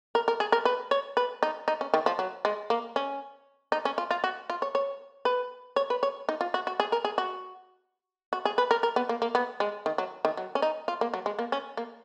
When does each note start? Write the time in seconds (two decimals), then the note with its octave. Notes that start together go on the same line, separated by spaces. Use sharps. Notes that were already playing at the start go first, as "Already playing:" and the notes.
0.15 A#4
0.28 A#4
0.40 G#4
0.52 A#4
0.65 B4
0.91 C#5
1.17 B4
1.43 D#4
1.68 D#4
1.81 C#4
1.94 D#3
2.06 F3
2.19 F#3
2.45 G#3
2.70 A#3
2.96 C#4
3.72 D#4
3.85 C#4
3.98 F4
4.11 F4
4.24 F#4
4.50 F4
4.62 C#5
4.75 C#5
5.25 B4
5.76 C#5
5.90 B4
6.03 C#5
6.29 D#4
6.41 F4
6.54 F#4
6.67 F#4
6.80 G#4
6.92 A#4
7.05 G#4
7.18 F#4
8.33 F#4
8.45 G#4
8.58 B4
8.71 A#4
8.83 A#4
8.96 B3
9.09 A#3
9.22 A#3
9.35 B3
9.60 G#3
9.86 D#3
9.98 F#3
10.25 D#3
10.37 F#3
10.55 C#4
10.62 D#4
10.88 F4
11.01 A#3
11.14 F#3
11.26 G#3
11.39 A#3
11.52 C#4
11.77 A#3